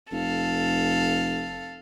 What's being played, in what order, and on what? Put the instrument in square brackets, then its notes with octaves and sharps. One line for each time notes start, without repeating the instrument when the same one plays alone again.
[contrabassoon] F1 [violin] A4 F5